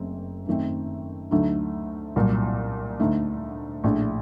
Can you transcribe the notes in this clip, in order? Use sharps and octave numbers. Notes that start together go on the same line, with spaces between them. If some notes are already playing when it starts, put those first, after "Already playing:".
Already playing: F#1 F#2 A3 C4
F#2 D#3 A3 C4
D2 D3 F#3 A3 D#4
C2 A#2 F#3
D2 D3 A3 D#4
A#1 A2 A3 D4